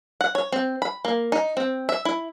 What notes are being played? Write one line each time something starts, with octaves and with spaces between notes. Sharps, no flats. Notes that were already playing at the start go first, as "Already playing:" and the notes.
F#5
C#5
C4
B5
A#3
D#4
C4
E5
E4